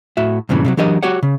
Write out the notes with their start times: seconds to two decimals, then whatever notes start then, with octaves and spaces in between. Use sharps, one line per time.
0.17 A2 F#4 E5
0.49 G2 A#2 C#3 E3
0.65 C3 E3 F#3
0.77 E3 F#3 D4 G4 A#4 D#5
1.03 F#4 G4 C#5 F#5
1.23 C#3